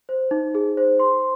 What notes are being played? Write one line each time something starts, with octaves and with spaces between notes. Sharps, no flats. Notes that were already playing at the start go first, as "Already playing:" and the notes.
C5
D#4
G#4
C5
C6